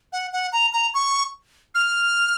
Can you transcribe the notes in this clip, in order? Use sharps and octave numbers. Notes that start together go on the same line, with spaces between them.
F#5
F#5
A#5
A#5
C#6
F6